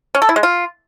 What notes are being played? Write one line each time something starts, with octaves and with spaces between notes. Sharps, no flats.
C#4
A4
E4
G#3
F4